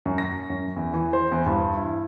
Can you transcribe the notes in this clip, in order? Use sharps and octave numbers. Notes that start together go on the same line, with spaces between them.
F#2
A#6
F#2
E2
E3
C5
E2
G2
E4